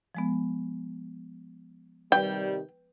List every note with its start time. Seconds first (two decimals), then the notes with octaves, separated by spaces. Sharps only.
0.15 F3 G#3 B3
2.12 C3 D#3 G3 B4 G5